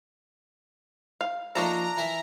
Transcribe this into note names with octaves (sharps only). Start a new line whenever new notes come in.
F5
F3 A3 A#3 D4 D#4 A4 A#5
E3 A#4 E5